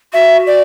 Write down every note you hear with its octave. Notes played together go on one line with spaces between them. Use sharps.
F#4 E5
D5